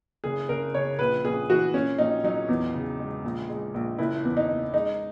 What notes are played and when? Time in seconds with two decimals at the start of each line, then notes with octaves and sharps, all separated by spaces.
0.24 F#1 G#4
0.49 F#1 A#4
0.74 C#3 C#5
0.99 A#1 B4
1.25 A#1 G#4
1.49 E3 F#4
1.74 A#2 C#4
1.98 A#1 D#4
2.24 F#3 D#4
2.48 E2
2.74 C#3
2.99 G#3
3.24 A#1
3.49 G#3
3.74 A#1
3.99 F#1 E4
4.24 E2
4.37 D#4
4.49 F#1
4.74 G#3 D#4